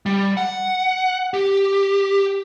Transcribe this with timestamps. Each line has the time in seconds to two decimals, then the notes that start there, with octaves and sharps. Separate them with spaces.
0.06 G3
0.37 F#5
1.34 G4